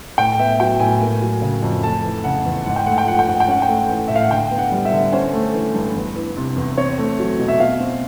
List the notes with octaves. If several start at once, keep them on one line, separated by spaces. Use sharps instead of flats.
A2 G5
B3 E5
F#3 G5
A2 G#5
A#3
F#3
C#3
F2
A3 A5
E3
C#3 F#5
E2
G#2 F#5
G5
A3 F#5
G5
F3 F#5
G5
G#2 F#5
G5
C#4 F#5
G5
A3 F#5
E3
A2 E5
F5
F#5
D3 G5
B3
F#5
G3
E5
D3
C#4 C5
A3
E3
G2
E2
E3
C3
E2
C4 C#5
A3
F#3
B2
E5
B2 F5
C4